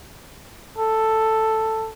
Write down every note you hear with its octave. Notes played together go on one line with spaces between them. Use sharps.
A4